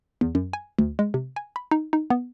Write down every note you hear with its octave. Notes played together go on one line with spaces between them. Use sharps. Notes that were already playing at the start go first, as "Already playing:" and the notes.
E2
F#2
G#5
D2
G#3
C3
G#5
B5
D#4
D#4
B3